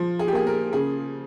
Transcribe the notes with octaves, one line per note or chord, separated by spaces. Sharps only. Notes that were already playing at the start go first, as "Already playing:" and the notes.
Already playing: F3
G#4
G4
A#3 G#4
A#4
C#3 G#4